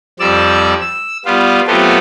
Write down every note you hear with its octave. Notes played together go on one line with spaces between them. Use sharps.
F2 G3 C4 D5 E6
E6
G3 B3 F4
F#3 A3 B3 C4 F4 G4